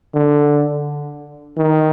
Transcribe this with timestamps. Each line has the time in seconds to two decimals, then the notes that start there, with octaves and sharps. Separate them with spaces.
0.14 D3
1.57 D#3